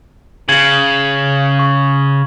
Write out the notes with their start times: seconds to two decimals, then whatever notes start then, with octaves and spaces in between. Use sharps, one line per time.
0.49 C#3 G#6 F#7
1.59 C#6